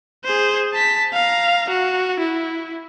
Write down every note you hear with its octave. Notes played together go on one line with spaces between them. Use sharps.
G#4 C5
A5 B6
F5 A#5
F#4
E4